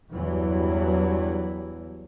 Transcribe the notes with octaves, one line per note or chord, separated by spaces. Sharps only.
E2 G2 E3 F#3